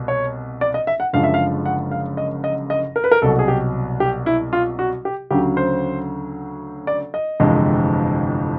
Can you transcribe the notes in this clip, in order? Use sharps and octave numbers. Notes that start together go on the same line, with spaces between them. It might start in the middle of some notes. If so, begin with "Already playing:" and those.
Already playing: C2 B2
C#5
D5
D#5
E5
F#5
F#1 F#2 D3 F3 G#3 F5
E5
F5
F#5
F5
D#5
D#5
D#5
A#4
B4
A#4
C2 B2 F#3 A4
G#4
G4
G4
E4
F4
F#4
G4
D2 C#3 F#3 G4
C5
D5
D#5
G1 F2 C3 E3 G#3